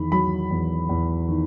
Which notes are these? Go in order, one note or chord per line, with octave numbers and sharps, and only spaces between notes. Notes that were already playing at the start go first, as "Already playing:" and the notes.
Already playing: E2 D#3 B5
F#3 B5
E2
E2
D#3